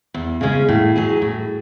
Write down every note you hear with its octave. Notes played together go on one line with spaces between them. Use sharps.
E2
C#3 G#3 C#4
A2
F#3 C#4 G#4
A2